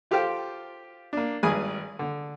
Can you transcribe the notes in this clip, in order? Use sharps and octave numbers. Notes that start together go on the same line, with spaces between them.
F4 G4 A4 C5 F5 G5
A#3 D4
G#1 G2 G#4 B4 G#5 D#6
D3